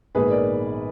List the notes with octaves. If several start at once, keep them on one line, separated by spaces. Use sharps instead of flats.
A#1 G#2 D#3 G#3 B3 G#4 B4
A#4 D5